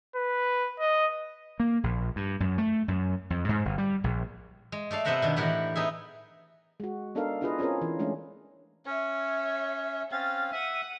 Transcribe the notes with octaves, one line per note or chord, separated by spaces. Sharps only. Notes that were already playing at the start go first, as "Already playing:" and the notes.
B4
D#5
A#3
A#1
G2
F#2
A3
F#2
F2
G#2
G1
G3
A#1
G#3
A3 A4 D5 F5
C3 B3 C5 E5 F#5 A#5
B2 D#3 D4
A2 E3 G4 A#4 F#5
B3 D#4 G#4 E5
G#3 F#4
B3 D4 D#4 A4 A#4 F5
D4 E4 F4 G#4 B4 D#5
C4 C#4 F4 G#4 A#4
E3
E3 G#3 A3 C#4 D4
C#4 C#5 E5
C4 C#4 F5 A6
E5 F#5 D#7